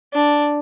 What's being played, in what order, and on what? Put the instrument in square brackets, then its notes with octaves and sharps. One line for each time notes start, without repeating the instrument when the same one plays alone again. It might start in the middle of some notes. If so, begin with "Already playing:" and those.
[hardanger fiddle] D4